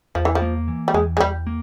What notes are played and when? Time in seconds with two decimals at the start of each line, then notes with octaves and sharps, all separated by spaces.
0.15 E2 F3
0.25 E3
0.35 F3
0.42 A#3
0.68 E3
0.88 G3
0.94 E2 G#3
1.17 G#3
1.20 E2 G3
1.47 A#3